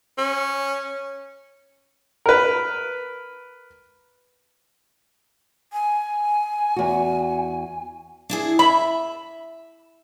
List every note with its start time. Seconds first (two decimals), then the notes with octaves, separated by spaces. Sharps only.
0.18 C#4
2.26 A#4 B4
5.73 G#5
6.76 E2 F#4
8.30 D4 E4 G#4
8.59 E5 B5